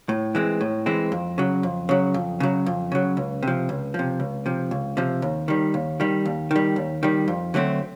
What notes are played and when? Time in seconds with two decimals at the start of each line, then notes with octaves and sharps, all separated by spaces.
0.09 A2
0.35 E3 G#3 C4
0.61 A2
0.86 E3 G#3 C4
1.12 F2
1.38 C#3 F#3
1.63 F2
1.89 C#3 F#3
2.14 F2
2.40 C#3 F#3
2.66 F2
2.92 C#3 F#3
3.17 C#2
3.43 C3 F3
3.69 C#2
3.94 C3 F3
4.20 C#2
4.46 C3 F3
4.71 C#2
4.97 C3 F3
5.22 D#2
5.48 D#3 G3
5.74 D#2
6.00 D#3 G3
6.25 D#2
6.51 D#3 G3
6.76 D#2
7.03 D#3 G3
7.28 F2
7.54 D3 F#3 A3 C4